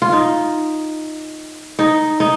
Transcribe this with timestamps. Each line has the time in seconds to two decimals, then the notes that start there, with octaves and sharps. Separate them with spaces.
0.02 F4
0.12 D#4
1.79 D#4
2.20 D#4